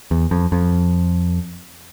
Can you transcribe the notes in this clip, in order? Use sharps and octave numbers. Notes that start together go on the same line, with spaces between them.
E2
F2
F2